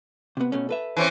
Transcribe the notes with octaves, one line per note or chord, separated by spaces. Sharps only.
C3 B3
B2 A3 C#4
A4 B4 E5
E3 C4 C#4